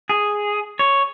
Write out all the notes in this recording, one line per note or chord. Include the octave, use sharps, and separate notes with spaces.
G#4
C#5